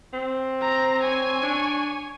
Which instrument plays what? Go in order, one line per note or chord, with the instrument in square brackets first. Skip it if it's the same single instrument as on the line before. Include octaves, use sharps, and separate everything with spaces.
[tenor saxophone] C4
[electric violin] A#5
C#5 G#5
[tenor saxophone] D4